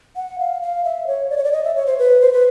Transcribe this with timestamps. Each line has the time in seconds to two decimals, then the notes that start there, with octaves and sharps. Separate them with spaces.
0.16 F#5
0.39 F5
0.62 F5
0.84 E5
1.07 C#5
1.30 D5
1.37 C#5
1.44 D5
1.52 D#5
1.64 E5
1.75 C#5
1.86 C5
1.98 B4
2.21 C5
2.33 B4